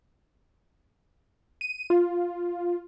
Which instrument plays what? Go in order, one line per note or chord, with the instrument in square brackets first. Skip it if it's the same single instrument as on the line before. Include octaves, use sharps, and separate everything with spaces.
[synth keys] D#7
F4